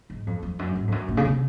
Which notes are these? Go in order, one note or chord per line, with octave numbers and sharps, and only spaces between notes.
G#2
F2
F2
F#2
G#2
F2
F#2
A#2
C#3
C3